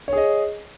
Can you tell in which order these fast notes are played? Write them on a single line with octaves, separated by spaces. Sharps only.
C#5 G#4 D#5